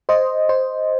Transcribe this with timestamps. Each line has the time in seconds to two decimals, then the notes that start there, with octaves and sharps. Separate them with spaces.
0.09 C5 D#5
0.49 C5